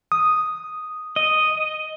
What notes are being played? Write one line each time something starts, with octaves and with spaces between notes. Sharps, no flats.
D#6
D#5